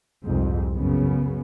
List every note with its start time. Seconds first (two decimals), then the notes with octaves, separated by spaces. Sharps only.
0.23 C2 F2 G#2
0.74 F#2 C#3 B3